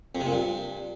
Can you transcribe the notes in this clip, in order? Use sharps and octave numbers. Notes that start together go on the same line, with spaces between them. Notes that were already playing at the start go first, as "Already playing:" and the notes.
F2
C3
A#2
G2